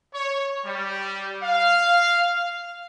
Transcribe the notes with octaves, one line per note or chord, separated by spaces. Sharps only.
C#5
G3
F5